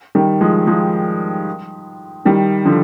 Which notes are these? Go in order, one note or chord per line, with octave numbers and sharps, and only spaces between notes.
D#3 G3
F3 G#3
F3 G#3
D#3 G3
D3 F3